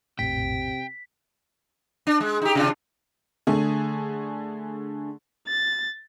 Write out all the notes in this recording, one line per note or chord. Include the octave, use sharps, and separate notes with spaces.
A#1 F2 A2 C3 G5 B6
D4
G#3
D#4 G4
C3 D4 F4
D3 A3 G#4
A6